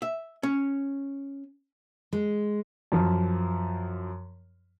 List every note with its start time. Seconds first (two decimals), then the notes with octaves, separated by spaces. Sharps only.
0.02 E5
0.43 C#4
2.13 G#3
2.92 F#2 F3